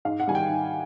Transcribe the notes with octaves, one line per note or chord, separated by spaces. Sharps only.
G#2 F5
F#5
D#3 G3 G#5
G5
G#2